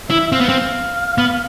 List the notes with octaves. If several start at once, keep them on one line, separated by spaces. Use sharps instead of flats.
E4 E5
E5
C4 F5
B3
C4
B3